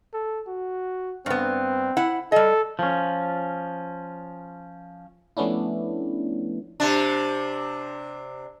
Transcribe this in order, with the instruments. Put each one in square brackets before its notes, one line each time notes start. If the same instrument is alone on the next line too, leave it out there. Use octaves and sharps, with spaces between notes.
[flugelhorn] A4
F#4
[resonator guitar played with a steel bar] G2 B3 [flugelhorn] C4
[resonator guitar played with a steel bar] E4 F#5
[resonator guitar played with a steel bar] G3 D#5 [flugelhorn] A4
[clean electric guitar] F3 C#4
[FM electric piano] F3 A3 B3 C#4 D4 E4
[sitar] C3 D4